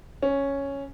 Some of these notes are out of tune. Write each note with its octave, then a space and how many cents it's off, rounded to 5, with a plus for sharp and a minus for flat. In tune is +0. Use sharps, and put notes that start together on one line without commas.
C#4 +0